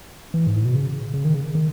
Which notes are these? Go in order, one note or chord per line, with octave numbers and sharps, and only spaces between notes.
E3
G#2
A2
B2
C#3
C#3
D#3
C#3
D#3